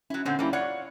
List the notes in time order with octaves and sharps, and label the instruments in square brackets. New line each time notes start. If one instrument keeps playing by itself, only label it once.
[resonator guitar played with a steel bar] F#3 E4 [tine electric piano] C#4
[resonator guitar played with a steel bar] A#2 D3 C4 [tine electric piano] C#4 F#5 G6
[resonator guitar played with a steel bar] G3 A#3 [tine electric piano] C#4 E4
[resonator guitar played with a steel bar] F4 C#5 F#5 [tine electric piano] D5